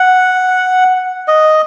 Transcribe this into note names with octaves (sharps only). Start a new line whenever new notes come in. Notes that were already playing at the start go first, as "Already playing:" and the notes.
Already playing: F#5
D#5